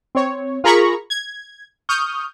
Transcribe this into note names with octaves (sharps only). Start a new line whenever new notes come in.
C4 C#5
F4 G#4 A#4 A#5 B5 C#6
G#6
C#6 D#6 F6 G6